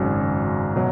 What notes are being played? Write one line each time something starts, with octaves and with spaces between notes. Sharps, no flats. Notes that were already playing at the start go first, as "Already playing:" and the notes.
Already playing: G#1 F#2 C#3 F#3
B2 F#3